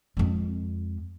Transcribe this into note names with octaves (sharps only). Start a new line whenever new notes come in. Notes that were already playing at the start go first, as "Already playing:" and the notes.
F2 G#3